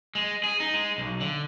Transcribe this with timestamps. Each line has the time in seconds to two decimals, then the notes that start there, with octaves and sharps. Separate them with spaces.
0.15 G#3
0.44 G#4
0.60 D#4
0.74 G#3
0.98 B1
1.21 D3